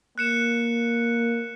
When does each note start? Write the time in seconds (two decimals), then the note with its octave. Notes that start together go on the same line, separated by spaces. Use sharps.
0.18 A#3 F#6 C#7 E7